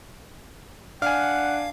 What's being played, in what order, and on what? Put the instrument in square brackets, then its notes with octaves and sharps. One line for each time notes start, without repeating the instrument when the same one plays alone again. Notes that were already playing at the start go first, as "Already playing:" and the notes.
[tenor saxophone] D4 [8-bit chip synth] F5 [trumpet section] F#5 [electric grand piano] G#5 F6